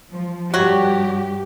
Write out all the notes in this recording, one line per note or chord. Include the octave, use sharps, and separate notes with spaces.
F3
G2 F#3 F#4 G4